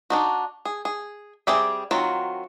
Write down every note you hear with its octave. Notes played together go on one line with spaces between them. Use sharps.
D4 D#4 F#4
G#4
G#4
G3 C4 G#4 D5 E5
D#3 F#3 C4 F4 F#4